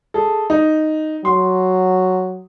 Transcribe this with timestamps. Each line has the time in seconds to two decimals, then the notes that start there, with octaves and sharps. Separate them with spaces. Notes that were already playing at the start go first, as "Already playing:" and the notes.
0.14 G#4 A4
0.50 D#4
1.25 F#3 C6